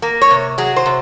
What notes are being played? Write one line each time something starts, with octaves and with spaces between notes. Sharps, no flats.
A#3
C#5
C3
F#3 G#4
C5
C3